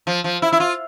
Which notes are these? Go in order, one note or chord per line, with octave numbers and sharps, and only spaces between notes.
F3
F3
E4
E4
F4